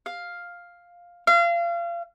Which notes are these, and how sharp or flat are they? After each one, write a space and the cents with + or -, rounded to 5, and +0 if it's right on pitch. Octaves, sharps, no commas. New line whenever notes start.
F5 +5
F5 -30